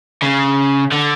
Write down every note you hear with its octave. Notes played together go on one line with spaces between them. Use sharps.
C#3
D3